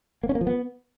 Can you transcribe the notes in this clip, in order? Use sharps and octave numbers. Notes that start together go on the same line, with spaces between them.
A#3
C#4
A#3
F3
B3